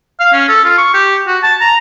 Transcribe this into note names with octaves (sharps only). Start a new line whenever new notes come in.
F5
C#4
A4
F4
C#6
G4
F#4
A5
A#5